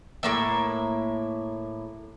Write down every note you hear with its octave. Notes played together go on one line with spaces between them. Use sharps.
A2 A#3 E5